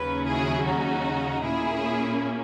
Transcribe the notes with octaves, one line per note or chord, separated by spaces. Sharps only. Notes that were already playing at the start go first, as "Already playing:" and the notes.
Already playing: D#2 C#3 F#3 C#4 B4
E4 G#4
D#4 F#4
A#2 A#3 C#4 E4 G#4